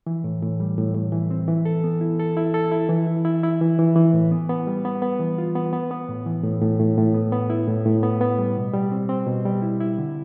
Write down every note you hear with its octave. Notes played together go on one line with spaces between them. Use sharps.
E3
A2
A2
G3
A2
A2
E3
C4
E3
A4
B3
E4
A4
E4
A4
E4
E3
E4
E4
E4
E3
E3
E3
A2
B3
B3
G3
B3
B3
E3
F4
B3
B3
B3
A2
E3
A2
A2
A2
A2
B3
B3
E4
A2
A2
B3
B3
G3
B2
G3
C4
C4
B2
G3
E4
E4
D3